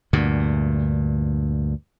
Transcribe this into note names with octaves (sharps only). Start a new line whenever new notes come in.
D2 G2 A#2